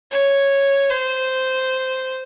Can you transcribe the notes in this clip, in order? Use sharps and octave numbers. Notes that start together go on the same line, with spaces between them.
C#5
C5